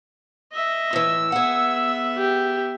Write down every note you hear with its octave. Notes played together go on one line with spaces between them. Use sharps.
D#5 E5
A2 E3 E6
B3 G#4 E5 F#5
G4